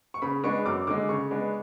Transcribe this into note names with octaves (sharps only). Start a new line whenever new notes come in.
C#6
C#3 B5
G#3 B3 D4 C#6
F#2 D6
D3 G#3 D6
C#3 C#6
G#3 B3 D4